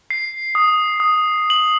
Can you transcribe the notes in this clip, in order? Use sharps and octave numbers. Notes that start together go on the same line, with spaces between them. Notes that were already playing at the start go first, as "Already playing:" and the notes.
C7
D#6
D#6
F#7